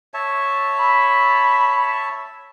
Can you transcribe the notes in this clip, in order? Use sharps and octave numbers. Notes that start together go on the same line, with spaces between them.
C#5 E5 A5
B5